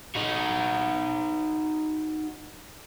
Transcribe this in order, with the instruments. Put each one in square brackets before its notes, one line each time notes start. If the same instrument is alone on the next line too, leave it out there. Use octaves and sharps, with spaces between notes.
[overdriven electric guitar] D#4 F#4